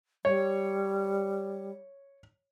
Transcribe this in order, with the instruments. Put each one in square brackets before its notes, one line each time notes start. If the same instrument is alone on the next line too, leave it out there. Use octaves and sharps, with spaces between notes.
[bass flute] G3 [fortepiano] C#5